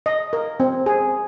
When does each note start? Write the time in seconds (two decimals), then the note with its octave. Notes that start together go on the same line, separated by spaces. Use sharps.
0.06 D#5
0.33 A#4
0.60 C4
0.86 G#4